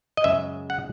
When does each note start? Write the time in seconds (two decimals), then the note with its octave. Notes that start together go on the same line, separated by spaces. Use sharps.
0.17 D#5
0.24 F#2 C#3 G#3 E5
0.70 F#5